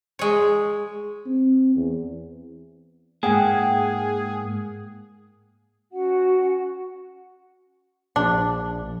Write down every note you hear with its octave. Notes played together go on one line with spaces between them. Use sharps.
G#3 C#5
C4
E2
G#2 A#3 G#4 F#5 G5
C#4 F#4 F#5
A#1 D4